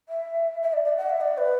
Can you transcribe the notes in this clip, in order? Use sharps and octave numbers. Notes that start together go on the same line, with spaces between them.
E5
E5
D5
D5
F#5
E5
D5
B4